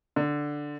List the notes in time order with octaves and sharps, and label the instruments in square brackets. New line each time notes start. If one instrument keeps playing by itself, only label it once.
[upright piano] D3